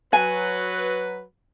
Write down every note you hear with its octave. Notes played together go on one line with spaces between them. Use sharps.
F#3 B4 G#5